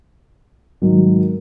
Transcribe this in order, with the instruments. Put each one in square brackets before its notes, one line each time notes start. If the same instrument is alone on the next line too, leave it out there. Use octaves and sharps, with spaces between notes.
[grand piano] G#2 D#3 F#3